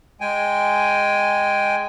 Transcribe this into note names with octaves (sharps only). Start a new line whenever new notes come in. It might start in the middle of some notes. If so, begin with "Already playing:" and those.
G#3 G5 G#5